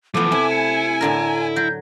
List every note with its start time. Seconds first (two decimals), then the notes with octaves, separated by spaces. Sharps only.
0.14 E3 F3 A3 B3 D6
0.32 C3 E4 G#5
0.51 C#7
1.01 A2 D3 A#4 A#5
1.56 F#3 G6